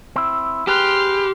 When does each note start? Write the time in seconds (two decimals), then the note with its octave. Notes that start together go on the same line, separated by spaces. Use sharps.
0.16 C4 E4
0.67 G4 G#4 B4 C6 F6